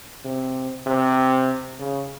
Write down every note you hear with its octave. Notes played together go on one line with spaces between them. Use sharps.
C3
C3
C#3